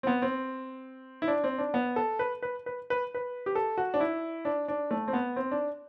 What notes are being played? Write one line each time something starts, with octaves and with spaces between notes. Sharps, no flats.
C4
B3
C4
E4
D4
C4
D4
B3
A4
B4
B4
B4
B4
B4
G4
A4
F#4
D4
E4
D4
D4
A3
C4
B3
C4
D4